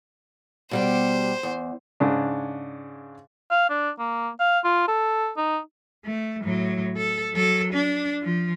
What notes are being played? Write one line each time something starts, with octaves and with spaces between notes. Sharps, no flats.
B2 G3 G4 C5
E2
G#2 C#3 D4
F5
D4
A#3
F5
F4
A4
D#4
A3
A2 F#3
A4
F#3 A4
D4
F3